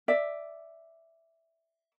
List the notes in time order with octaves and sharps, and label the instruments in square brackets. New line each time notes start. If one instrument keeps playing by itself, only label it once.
[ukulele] D5 E5